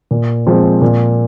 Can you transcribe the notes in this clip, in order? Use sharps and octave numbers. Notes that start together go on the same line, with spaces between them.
A#2
F3 G#3 C4
A#2